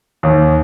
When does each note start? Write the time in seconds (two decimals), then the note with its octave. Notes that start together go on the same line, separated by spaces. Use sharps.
0.23 D#2